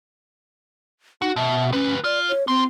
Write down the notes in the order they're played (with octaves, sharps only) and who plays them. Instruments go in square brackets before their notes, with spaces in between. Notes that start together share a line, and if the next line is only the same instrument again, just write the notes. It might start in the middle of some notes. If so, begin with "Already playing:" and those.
[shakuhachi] D#4 [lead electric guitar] F#4
[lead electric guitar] B2 [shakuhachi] E5
[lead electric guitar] D2 B4 [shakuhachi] C#4
[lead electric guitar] F4 [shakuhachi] D5
[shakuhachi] C#5
[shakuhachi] C4 [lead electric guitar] F4 C6